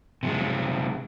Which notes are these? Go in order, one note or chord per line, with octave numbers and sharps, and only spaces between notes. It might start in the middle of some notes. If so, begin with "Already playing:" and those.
C3 F3 G#3